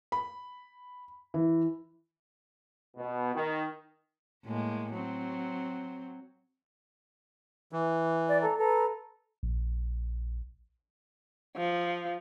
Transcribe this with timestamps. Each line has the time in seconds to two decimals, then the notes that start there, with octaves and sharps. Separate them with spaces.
0.12 B5
1.34 E3
2.96 B2
3.34 D#3
4.45 A2 G#3 A#3
4.93 F#3 C4
7.72 E3
8.28 D5
8.41 A4 A#5
8.57 A4 B4 A#5
9.43 A#1
11.56 F3